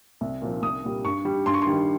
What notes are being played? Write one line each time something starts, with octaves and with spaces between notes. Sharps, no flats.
C2
A#2 F3
C2 D#6
A#2 G3
G2 C#6
G3
G2 C6
C#6
C6
D#3 G3